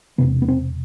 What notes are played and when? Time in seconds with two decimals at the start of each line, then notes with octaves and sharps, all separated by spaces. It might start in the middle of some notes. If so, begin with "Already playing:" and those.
0.18 E1 E2 C3 B3
0.42 B3
0.48 C4